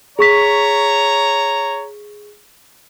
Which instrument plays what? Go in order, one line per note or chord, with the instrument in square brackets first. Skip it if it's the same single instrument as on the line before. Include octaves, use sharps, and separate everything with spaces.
[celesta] G#4 C#6 B6 [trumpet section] C#5 A#5